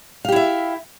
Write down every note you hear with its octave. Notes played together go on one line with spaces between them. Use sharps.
E4 G4 E5 F5